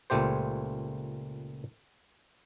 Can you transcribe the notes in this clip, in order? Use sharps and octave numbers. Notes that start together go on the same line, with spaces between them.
C#2 A#2 A3 G4 C5